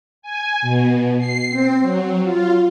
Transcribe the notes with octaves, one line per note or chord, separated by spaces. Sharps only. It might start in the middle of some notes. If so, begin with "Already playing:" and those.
G#5
B2
C7
C4
F#3
F4